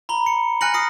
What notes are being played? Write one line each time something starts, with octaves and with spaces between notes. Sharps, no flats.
A#5 B5 G7
C#7
G#5 F6 F#6 A#6 C#7 F#7
D#6 A#6 C7 C#7